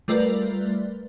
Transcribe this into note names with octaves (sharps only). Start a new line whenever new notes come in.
G3 A3 F4 A#4 B4 D5